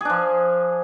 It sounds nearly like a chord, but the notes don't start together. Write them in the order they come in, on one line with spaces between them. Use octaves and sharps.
G#4 D4 F3